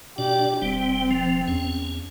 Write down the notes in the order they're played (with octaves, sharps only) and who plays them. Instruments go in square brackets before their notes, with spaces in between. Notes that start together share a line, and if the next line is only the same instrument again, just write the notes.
[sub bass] B2 [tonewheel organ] D4 D5 [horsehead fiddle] G4
[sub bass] E1 [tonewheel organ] G3 [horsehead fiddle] C4
[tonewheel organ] F3
[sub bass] E2 [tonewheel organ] C#4